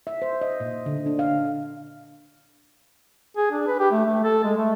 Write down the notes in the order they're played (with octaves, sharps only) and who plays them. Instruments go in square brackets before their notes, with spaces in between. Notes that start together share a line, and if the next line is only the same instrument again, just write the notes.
[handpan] E5
C5
D#5
A#2
D3
D4
F5
[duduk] G#4
D4
B4
G4
A3
A3
A4
G#3
A3